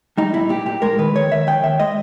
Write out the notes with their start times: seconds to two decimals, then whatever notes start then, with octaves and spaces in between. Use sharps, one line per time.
0.18 G3 D#4
0.34 A#2 E4
0.49 A#2 G4
0.66 A#2 G4
0.82 G#3 A#4
0.98 D#3 B4
1.15 D#3 C#5
1.31 D#3 E5
1.47 D#3 G5
1.63 D#2 E5
1.80 G#3 D#5